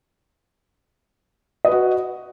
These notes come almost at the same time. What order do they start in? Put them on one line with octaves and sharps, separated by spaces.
D#5 B4 F#4